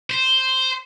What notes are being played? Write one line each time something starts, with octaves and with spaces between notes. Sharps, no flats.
C5